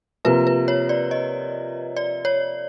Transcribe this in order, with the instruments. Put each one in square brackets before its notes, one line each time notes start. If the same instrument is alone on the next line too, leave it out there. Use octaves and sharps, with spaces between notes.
[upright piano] C3 F3 A#3 [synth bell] B4
[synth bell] B4
C#5
D5
D#5
D5
C#5